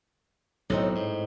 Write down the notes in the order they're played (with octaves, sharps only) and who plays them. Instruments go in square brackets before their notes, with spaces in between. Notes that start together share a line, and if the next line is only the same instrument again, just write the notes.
[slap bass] B1 [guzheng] A2 C4 D#4
[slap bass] G#2